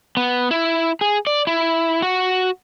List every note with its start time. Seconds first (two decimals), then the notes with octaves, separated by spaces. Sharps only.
0.17 B3
0.51 E4
1.01 G#4
1.27 D5
1.47 E4
2.02 F#4